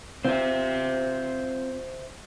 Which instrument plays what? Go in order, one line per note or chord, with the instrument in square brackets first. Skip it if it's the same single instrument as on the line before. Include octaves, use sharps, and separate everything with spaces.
[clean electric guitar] C4 F4 [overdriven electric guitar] C5 E5